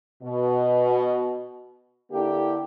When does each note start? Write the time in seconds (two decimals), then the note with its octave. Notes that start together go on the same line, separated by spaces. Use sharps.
0.23 B2
2.11 D3 A#3 E4 G4